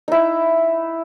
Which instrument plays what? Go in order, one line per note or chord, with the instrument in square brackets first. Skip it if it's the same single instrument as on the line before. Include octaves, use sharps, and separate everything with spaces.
[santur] D#4 E4